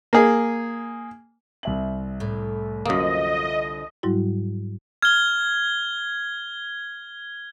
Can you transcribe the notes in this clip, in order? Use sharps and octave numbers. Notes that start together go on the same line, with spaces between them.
A#3 G#4
C2 E5 F#7
A2
F#2 D3 F3 A#3 D#5
G#2 F#3 G3 E4 F#4
F6 G#6 G7